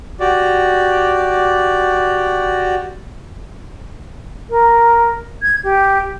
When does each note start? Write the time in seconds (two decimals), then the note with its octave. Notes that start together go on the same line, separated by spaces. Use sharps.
0.20 F#4 G4 D5
4.50 A#4
5.42 G#6
5.64 G4